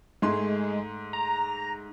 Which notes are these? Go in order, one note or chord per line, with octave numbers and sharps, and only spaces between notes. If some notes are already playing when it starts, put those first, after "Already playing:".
G#2 G#3 A3 C6
A#5